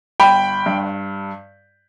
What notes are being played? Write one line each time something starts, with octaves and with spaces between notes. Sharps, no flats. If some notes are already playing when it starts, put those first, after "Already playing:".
G1 G5 B5
G2